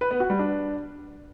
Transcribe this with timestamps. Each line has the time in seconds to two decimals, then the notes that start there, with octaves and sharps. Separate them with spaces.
0.01 B4
0.11 B3
0.20 F#4
0.30 G3
0.39 D4